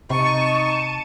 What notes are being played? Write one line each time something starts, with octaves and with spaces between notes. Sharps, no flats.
C3 D#4 A5 C#6 C#7 D#7